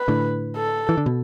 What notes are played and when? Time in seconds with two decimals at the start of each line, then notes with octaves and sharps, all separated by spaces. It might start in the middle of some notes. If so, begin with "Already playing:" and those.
Already playing: B4
0.08 A2 D3
0.57 A4
0.89 E3
0.97 D3
1.06 B2